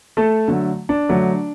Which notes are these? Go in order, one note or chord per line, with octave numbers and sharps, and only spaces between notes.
A3 A4
D3 F#3 A3
D4
D3 F#3 A3